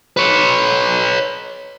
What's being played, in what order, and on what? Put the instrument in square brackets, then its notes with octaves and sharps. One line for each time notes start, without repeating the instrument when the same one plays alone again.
[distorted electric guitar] B4 C#5